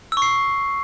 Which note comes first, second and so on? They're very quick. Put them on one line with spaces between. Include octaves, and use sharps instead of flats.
E6 C#6 C7